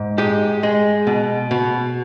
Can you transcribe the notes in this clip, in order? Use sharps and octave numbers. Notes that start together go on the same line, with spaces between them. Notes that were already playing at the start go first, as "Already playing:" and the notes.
Already playing: G#2
G#3 G4
G#3
B2
B2